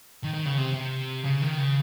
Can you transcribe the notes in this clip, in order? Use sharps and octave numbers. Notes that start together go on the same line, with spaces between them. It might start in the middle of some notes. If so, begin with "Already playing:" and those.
D#3
D#3
C#3
C3
C3
C#3
D#3
C#3